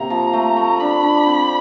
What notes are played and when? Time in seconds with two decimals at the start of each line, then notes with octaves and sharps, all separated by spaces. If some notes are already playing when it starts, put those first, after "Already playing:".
Already playing: C3 A#3 A#5
0.10 F3
0.33 A3
0.57 A3
0.80 D4 B5
1.03 D4
1.27 C4